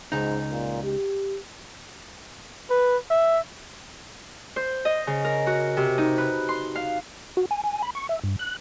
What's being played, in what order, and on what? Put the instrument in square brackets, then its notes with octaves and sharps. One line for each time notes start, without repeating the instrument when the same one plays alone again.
[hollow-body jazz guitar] C#2 D#4 [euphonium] G#2
[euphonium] A#2
G4
[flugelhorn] B4
E5
[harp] C5
D#5
C#3
A#4
F#4
C3
D#4
B4
C6
F5
[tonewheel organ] F#4
G#5
G#5
B5
C#6
E5
G2
F#6